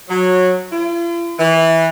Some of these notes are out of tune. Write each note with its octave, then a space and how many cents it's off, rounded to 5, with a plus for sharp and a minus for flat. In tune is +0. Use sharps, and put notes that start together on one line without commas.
F#3 -15
F4 -45
E3 -15